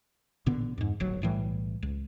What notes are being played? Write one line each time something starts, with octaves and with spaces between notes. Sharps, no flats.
A1 A#2 D3 B3
F2 G#2
D1 G1 F#3
B1 A2 E3 G3
C#2